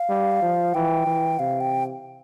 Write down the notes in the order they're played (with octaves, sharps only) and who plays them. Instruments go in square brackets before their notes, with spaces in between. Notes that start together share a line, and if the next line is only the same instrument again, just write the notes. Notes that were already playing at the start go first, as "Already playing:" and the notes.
Already playing: [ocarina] F5
[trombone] G3
F3
[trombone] E3 [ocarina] G5
[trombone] E3
[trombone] C3 [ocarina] F5
[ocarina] G5